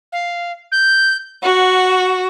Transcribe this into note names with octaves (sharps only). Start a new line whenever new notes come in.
F5
G6
F#4 F#5